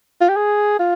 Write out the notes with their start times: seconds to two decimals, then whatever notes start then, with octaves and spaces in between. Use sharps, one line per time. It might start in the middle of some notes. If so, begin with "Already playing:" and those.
0.21 F4
0.29 G4
0.36 G#4
0.79 F4